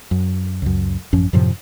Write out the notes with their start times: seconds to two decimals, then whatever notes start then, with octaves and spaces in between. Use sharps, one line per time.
0.11 F#2
0.62 C#2 F#2
1.13 A1 F#2 F3 C#4
1.33 F#2 A2 C3 F3